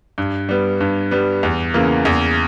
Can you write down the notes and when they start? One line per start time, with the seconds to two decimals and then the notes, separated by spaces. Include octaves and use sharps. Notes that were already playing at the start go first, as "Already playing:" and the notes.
0.18 G2
0.49 G3 B3
0.81 G2
1.11 G3 B3
1.43 E2
1.74 C#3 E3 A#3
2.05 E2